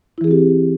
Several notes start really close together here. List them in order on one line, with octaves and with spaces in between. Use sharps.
E4 E3 G#4 C4 G4